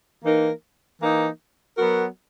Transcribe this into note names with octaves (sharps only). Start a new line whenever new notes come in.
E3 A#3 D#4 A#4
E3 A#3 D#4
F#3 B3 F#4 A#4